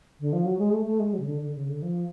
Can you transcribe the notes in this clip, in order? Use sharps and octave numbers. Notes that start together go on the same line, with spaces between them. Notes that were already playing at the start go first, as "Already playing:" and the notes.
D3
F3
F#3
G#3
A3
A3
G#3
F#3
C#3
D3
D3
C#3
D3
F3